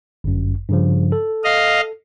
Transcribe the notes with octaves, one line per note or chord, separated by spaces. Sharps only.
G1 F#2
G2 C#3 F3
A4
D#5 F5